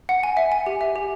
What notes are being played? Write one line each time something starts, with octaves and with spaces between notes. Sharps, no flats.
F#5
G#5
E5
G#5
G4
E5
G4